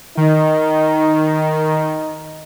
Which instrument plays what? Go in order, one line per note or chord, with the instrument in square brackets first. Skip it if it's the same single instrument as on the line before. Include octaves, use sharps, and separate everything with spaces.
[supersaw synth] D#3 [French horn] D#4